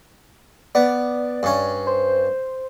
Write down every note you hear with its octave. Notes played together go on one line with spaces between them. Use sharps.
B3 D5
G2 C#4
C5